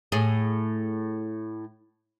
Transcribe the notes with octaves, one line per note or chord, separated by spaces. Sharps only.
A2 G#4